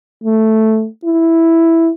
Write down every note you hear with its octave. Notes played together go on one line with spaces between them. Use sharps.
A3
E4